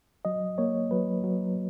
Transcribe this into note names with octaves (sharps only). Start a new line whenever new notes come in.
F#3 D#5
A#3 C#5
F#3 B4
F#3